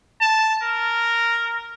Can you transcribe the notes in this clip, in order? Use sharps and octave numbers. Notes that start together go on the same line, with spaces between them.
A5
A#4